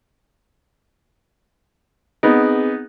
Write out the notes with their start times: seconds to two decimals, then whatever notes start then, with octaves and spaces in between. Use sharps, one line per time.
2.23 B3 C4 D#4 G#4